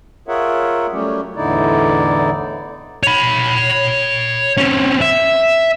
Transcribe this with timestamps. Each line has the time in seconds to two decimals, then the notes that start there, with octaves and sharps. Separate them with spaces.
0.28 F4 G#4 A#4 C#5 E5 F#5
0.93 F#3 G3 A3 C#4 G4
1.36 E2 A2 D3 D#4 E4 D5
3.03 C#5 B5
4.57 C4 C#4
5.01 E5